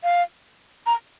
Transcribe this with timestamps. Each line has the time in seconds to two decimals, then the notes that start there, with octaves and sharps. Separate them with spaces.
0.04 F5
0.86 A#5